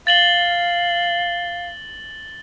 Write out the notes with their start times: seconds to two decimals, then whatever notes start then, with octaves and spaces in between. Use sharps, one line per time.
0.07 F5 A6 F#7 G7